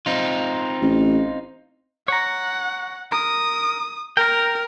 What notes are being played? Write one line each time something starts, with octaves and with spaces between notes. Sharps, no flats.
C4 D#4 F4
A1
C#5 F#5 A#5
A#4 D#6
A#4 G5 A#5